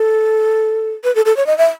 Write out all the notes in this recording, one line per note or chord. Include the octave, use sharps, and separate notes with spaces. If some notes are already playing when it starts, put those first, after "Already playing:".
Already playing: A4
B4
A4
A4
C#5
D#5
E5